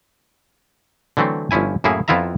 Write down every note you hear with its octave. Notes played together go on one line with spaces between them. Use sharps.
D3 E3 F#3 A3 C4
G1 F3 C#4 E4 G#5
F#2 A2 A#3 E4 G#4
F2 B3 E4 F4 E5 A#5